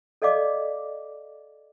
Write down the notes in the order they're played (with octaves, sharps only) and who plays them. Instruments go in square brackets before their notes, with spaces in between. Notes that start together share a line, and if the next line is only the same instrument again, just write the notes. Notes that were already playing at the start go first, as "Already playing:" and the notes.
[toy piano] A4 D5 D#5 F5 D6